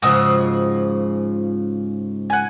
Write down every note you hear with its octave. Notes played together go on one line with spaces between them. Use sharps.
G#2 C#3 F3 F#4 D#6 E6
F#5 G#5